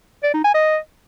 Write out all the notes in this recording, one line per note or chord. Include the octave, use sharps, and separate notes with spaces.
D5
D#4
G#5
D#5